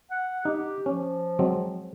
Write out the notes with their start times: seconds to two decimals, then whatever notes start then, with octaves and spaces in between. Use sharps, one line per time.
0.10 F#5
0.45 D#4 G4
0.86 F3 C#4
1.39 F#3 G#3 C4